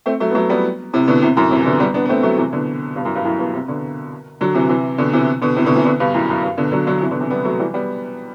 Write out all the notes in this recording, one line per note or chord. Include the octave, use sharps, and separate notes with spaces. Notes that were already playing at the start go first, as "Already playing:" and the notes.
A3 C4
F#3 A3
B3
F#3 A3
G3 B3
A2 C3
B2 D3
A2 C3
F#2 A2
A2 C3
E3
B2 D3
G3 B3
B3 D4
B3
A3 C4
F#3 A3
C3 E3
B2 D3
G2 B2
F#2 A2
G2
F#2 A2
G2 B2
A2 C3
B2 D3
D3 F#3
C3 E3
C3 E3
B2 D3
C3 E3
B2 D3
A2 C3
B2 D3
C3 E3
B2 D3
G2 B2
F#2 A2
F#2
G2
B2 D3
D3 F#3
D3 F#3
C3 E3
B2 D3
C3 E3
G3 B3
F#3 A3
E3 G3
G3 B3